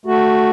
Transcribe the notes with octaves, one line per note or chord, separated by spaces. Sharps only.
A3 F#4